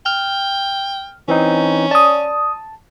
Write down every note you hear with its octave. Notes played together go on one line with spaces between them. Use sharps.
G5 F6
E3 C4 C#4 D#4
D5 A5 D#6